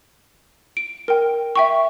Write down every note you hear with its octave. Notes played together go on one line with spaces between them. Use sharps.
D7
A#4 G5
E5 G5 C#6